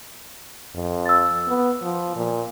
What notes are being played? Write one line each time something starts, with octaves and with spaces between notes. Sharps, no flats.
F2
E6 A6
B3
F3
A#2